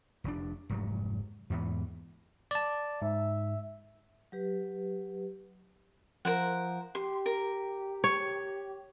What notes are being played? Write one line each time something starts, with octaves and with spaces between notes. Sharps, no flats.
F1 B2 D4
F1 G#2 F#3
E2 G#2 E3 B3
D5 A5
G#2 E5
F#3 G4 B4
F3 A#4 C5 F#5
G4 C6
A#4
C#5